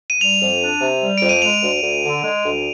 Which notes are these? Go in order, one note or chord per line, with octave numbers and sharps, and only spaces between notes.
D#7
G3 F7
F2
D4
C3
G3
F2 D7
D#7
G#3 F7
D2
D2
D3
G#3
D2